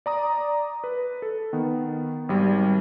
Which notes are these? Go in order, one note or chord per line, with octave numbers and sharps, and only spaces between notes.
D5 A#5 D#6
B4
A4
D#3 B3
G#1 G3